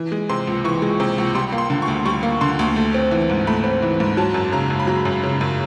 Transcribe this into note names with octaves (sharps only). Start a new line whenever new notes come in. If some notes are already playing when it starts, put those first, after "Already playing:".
Already playing: E3
G#3
C3 C6
C#2
E3 C#6
G#3
C3
C#2
G3 C6
A#3
C6
D3
C#6
D2
G3 C#6
A#3
D3 C6
D2
A3
C4
E3
G#2
A3 B5
C4
E3
G#2
F#3 A5
F#2
C#3 A#5
F#2
B5
F#3 A#5
F#2
C#3
F#2